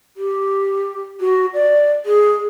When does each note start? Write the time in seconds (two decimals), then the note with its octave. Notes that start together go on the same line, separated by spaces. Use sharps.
0.17 G4
1.21 F#4
1.54 D5
2.06 G#4